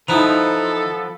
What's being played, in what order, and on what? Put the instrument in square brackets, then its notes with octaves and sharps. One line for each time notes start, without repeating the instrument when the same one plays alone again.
[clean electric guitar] F3 B3 [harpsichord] D#4 E4 A#5 [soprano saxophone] A4